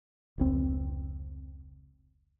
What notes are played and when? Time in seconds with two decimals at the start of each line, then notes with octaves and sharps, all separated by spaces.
0.38 F1 C#2 C4